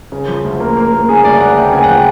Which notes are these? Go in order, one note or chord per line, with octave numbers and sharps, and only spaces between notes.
C#3
F3
D2
A#3
A#3
A#3
C#3 G#4
D2 D5
D2 F#5
D2 G5
C#3 G#5
F#5
F3 G5